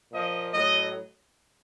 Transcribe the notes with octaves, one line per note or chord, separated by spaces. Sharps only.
A#2 F3 D#5
A2 F#3 D#5